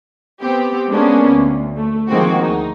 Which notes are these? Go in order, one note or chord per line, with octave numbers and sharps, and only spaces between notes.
B3 C4 G4
G#3 A#3 B3 C#4 D4
D2
A3
D#3 F3 G#3 A#3 C4 F#4
D2 D#4